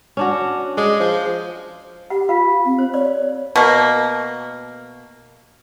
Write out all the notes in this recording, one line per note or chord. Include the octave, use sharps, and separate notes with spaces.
C#4 D4 F#4
G#3 D5
F3
G4 F#5
F4 F5
C4
C5
C#5 D5
B2 A#3